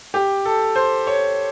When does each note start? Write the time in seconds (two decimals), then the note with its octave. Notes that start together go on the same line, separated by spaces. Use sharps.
0.14 G4
0.45 A4
0.76 C5
1.07 C#5